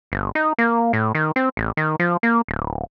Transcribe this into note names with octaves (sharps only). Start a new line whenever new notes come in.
G1
D#4
A#3
A2
D#3
C4
A1
D#3
F3
A#3
D1